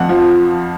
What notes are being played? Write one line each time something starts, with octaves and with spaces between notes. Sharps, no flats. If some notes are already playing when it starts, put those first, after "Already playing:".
Already playing: F2 F#5
F3